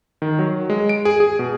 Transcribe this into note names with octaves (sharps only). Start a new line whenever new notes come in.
D#3
F#3
G#3
D7
G#4
G#4
B2